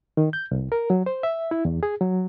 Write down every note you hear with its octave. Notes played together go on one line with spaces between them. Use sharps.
D#3
G6
C2
A#4
F#3
C5
E5
E4
E2
G#4
F#3